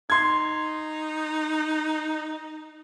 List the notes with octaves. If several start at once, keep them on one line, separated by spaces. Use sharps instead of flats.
D#4 C6 G#6